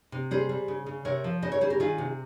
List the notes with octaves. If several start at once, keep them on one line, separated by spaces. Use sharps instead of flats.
C3
G3 G#4 C5
G3
C#3
C#3
C3 A#4 C#5
F3
C#3 C5 D#5
A#4 C#5
G3 G#4 C5
G4 A#4
D#3 F4 G#4
C3